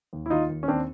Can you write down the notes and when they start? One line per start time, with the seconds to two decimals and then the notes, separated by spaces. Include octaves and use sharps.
0.13 D#2
0.26 E4
0.30 D#3 D#4 F4
0.49 D#2
0.63 C#4
0.68 D#2 C4 D4